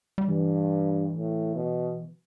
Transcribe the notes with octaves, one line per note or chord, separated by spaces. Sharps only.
G3
G2 E3
A2
B2